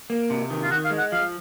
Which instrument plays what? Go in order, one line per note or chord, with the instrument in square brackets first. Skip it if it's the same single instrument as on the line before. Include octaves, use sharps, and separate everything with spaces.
[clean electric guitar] A#3
C3
D#3
[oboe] F4
[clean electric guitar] D#3 [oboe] F#4
[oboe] F5
[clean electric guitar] G#3
[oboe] F#5
[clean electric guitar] F3 [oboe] F5